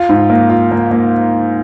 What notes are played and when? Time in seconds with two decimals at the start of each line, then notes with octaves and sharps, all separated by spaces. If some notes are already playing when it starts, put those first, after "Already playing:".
Already playing: F4
0.09 G#2
0.30 A#3
0.50 F4
0.72 A#3
0.91 A#3